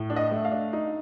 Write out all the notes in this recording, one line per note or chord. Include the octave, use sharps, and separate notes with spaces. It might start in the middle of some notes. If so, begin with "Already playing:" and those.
Already playing: A2
D4
D#5
A3
F5
D4
D#4